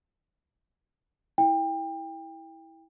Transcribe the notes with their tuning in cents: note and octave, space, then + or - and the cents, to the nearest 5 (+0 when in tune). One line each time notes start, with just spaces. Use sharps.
E4 -15 G5 +25